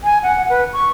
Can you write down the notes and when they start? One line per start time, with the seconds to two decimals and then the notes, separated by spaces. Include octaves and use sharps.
0.04 G#5
0.23 F#5
0.49 B4
0.73 C#6